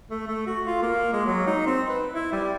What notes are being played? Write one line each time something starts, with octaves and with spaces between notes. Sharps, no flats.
A3
A3
F#4
F4
A#3
G#3
F#3
D#4
C4
B4
E4
G3